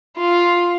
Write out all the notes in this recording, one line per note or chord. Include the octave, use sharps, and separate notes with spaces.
F4